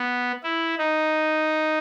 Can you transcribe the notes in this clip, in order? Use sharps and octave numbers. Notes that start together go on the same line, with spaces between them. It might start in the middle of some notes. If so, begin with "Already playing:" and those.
Already playing: B3
E4
D#4